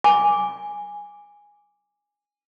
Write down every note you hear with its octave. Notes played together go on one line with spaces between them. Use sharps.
G#5 D6